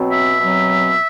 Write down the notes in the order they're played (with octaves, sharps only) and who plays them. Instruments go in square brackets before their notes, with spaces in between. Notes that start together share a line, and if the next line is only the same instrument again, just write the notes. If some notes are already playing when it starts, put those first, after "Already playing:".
Already playing: [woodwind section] B2 F#3 C4
E5
B2 F#3 C4